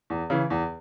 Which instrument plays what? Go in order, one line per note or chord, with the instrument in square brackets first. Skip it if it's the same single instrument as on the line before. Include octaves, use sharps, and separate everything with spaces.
[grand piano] E2
C#3 E3
E2